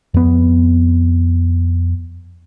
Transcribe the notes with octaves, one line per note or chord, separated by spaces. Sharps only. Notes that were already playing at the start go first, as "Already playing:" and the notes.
F2 B3